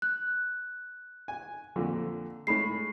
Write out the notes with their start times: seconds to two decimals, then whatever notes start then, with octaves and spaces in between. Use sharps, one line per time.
0.02 F#6
1.28 G#5
1.76 F2 A#2 D3
2.47 A2 G#3 B5 C7